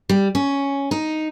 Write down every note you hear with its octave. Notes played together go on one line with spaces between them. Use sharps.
G3
C#4
D#4